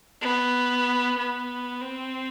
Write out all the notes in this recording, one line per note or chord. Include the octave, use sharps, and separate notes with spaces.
B3
B3
C4